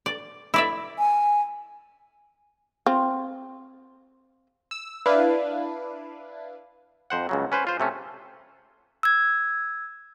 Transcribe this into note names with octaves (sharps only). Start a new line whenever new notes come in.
D5
E4 D5 E5
G#5
C4 F4
E6
D4 E4 B4 F5
F2 C5 F#5
C#2 C#3 F#3
C#4 B4 C5
F4 C5
C3 A3 C#4
E6 G#6